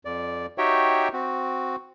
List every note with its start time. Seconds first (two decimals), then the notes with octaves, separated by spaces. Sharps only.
0.05 F2 D5
0.58 D#4 F#4 G4 C#5 E5 G5
1.13 C4 F#4